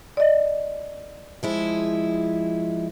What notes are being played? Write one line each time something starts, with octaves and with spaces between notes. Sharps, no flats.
D5 D#5
F3 G#3 E4